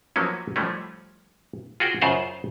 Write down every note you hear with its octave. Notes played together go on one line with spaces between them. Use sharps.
F3 F#3 A#3 B3 C#4
F3 G3 A3 C#4
F4 F#4 G#4 G5
F#2 C#3 F4 C5 F5 F#5